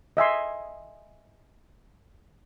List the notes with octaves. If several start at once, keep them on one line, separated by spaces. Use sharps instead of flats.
D#5 E5 G#5 C6